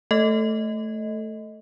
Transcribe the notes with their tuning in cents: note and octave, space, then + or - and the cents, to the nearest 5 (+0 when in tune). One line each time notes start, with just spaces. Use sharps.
A3 +0 A4 +5 D#5 +15